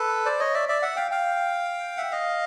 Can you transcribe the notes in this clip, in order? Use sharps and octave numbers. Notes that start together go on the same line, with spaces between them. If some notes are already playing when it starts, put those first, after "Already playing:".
Already playing: A4 B4
C5 D5
C#5 D#5
D5 E5
D5 E5
E5 F#5
F5 G5
F5 G5
E5 F#5
D#5 F5